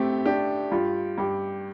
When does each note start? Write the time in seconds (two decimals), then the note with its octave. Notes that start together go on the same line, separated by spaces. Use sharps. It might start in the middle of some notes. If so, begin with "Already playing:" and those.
Already playing: A2 A3 C4 G4
0.26 D4 G4
0.72 G2 F4
1.18 G2 G4